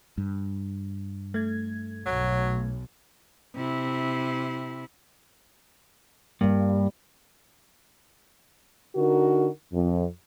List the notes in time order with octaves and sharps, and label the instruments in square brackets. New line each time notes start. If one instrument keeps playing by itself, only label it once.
[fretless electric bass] G2
[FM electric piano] A3 G#6
[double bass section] B1 [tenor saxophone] F#3
[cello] C3 E4
[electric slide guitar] G2 [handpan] G3 A#3
[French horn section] D3 D#4 F#4 A#4
F2